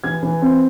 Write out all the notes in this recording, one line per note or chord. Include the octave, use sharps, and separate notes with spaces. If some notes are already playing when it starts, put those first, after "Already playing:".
E3 G#6
E3
C4